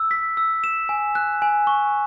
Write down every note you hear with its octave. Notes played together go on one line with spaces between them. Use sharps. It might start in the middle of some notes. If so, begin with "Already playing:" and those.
Already playing: E6
B6
E6
E7
G#5
F#6
G#5
C#6